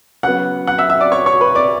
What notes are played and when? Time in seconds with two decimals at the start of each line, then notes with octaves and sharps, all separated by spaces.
0.23 C#3 F#3 B3 F#5 F#6
0.67 F#5 F#6
0.78 E5 E6
0.90 E5 E6
1.01 D5 D6
1.12 C#5 C#6
1.26 C#5 C#6
1.41 B4 B5
1.55 D5 D6